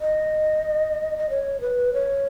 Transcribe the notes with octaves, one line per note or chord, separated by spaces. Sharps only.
D#5
D#5
C#5
B4
C#5